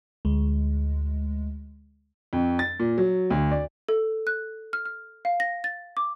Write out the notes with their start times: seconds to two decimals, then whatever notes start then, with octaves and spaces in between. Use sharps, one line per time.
0.25 D2 G#3
2.33 F2
2.59 A6
2.80 A#2
2.98 F#3
3.30 D2
3.51 D5
3.88 A4
4.27 F#6
4.73 F6
4.86 F6
5.25 F5
5.40 A#6
5.64 A6
5.97 D6